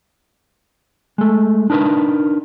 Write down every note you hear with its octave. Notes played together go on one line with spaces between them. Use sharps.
G#3 A3
D4 D#4 A#4 B4